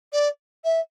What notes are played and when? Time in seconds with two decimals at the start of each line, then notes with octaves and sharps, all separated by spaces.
0.13 D5
0.64 E5